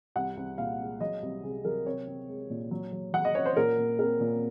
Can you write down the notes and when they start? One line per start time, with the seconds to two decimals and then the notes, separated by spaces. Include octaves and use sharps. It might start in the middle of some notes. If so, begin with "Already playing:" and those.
0.16 C2 F#5
0.37 C2
0.58 A#2 F5
0.79 G#3
1.00 F#3 D#5
1.22 C2
1.43 C3 G#4
1.65 F#3 A#4
1.86 C4 C#5
2.07 C4
2.29 G#3
2.50 A#2
2.71 F#3
2.92 F#3
3.13 F#3 F#5
3.25 D#5
3.35 C#4 C#5
3.45 C5
3.56 A#2 A#4
3.78 A#2
3.99 C4 A#4
4.20 A#2